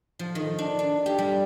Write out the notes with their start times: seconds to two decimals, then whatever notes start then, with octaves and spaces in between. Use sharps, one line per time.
0.19 F3
0.35 D#3
0.59 D4
0.79 D4
1.06 G4
1.18 G3